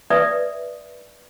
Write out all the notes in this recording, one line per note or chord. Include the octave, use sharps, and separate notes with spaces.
B4 D5 E5 D#6